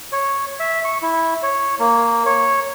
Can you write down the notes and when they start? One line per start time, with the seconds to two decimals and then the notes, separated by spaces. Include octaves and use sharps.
0.12 C#5
0.60 E5
0.84 C#6
1.02 E4
1.43 C#5
1.80 A#3
2.26 C#5